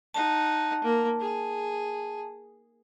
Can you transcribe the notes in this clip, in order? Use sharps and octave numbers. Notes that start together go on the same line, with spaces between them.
D#4 F#5 A5
A#3
G#4